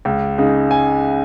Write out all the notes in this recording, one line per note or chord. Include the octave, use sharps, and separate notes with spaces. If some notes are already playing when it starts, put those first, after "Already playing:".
C#2
C#3 G#3 D#4
G#5